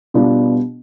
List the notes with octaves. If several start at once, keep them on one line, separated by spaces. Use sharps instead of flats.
B2 G3 B3 D4 F4